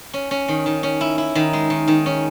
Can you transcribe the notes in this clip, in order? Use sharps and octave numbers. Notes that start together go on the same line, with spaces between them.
C#4
C#4
D#3
D#3
C#4
E4
E4
D#3
G#3
D#3
D#3
C#4